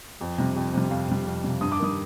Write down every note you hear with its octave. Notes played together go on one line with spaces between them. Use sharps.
F2
C3 G3
F2
C3 G3
F2 F5
C3 G3
F2
C3 G3
G2 D#6
D6
D#3 G3 D#6